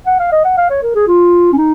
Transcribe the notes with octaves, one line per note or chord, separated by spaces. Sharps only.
F#5
F5
D#5
F#5
F5
C#5
A#4
G#4
F4
C#4
D#4